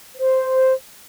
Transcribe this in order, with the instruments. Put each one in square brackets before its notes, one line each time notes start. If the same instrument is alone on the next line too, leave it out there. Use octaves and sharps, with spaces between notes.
[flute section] C5